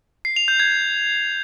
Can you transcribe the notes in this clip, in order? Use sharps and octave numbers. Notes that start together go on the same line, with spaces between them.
C7
F7
G6
G#6